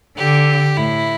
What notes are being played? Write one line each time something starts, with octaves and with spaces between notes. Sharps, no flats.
D3 G4
A2 E4